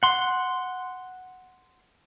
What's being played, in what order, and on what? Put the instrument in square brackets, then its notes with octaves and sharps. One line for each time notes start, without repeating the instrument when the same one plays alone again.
[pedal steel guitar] F#5 C6